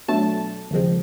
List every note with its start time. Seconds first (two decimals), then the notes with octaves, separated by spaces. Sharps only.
0.08 B2 F#3 A3 D4 A5
0.71 D#2 C#3 F3 G#3 C4